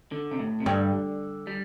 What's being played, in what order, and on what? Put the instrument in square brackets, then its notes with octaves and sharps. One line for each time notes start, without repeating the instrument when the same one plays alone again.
[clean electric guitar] D3
C3
A2
C3
[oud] G2 [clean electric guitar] D3
[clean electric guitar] G3